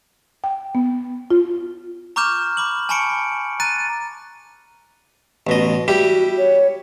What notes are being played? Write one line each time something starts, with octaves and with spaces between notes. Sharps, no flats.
G5
B3
F4
A#5 C#6 D6 F6 G6 E7
B5 D6 F#7
G#5 A5 B5 C#6 C#7 D7
A#5 F#6 A6 D#7
A1 B2 D#5
G3 E4 F#4 G4
C#5